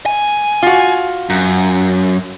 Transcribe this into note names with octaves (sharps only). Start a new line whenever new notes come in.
G#5
F4 F#4
F#2